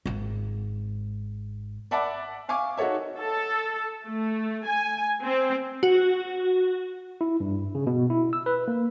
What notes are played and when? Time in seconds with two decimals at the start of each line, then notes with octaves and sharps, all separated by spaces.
0.06 G#1 G#2
1.91 D5 E5 F#5 A5 B5 D6
2.49 E5 F5 G#5 C#6 D6
2.77 D#4 F#4 A4 C#5 E5
3.20 A4
4.05 A3
4.66 G#5
5.23 C4
5.83 F#4
7.21 E4
7.40 G2
7.75 C#3
7.87 B2
8.10 E4
8.33 E6
8.46 B4
8.68 A#3